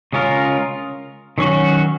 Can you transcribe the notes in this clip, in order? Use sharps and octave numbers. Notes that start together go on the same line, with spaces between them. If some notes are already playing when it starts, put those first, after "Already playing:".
C#3 G#3 C#4 F4 A#4
D#3 F#3 C#4 F#4